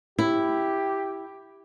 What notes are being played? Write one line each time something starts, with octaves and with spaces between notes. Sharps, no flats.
E4 G4